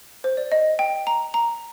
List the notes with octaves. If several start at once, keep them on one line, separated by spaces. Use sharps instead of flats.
C5
D5
D#5
G5
A#5
A#5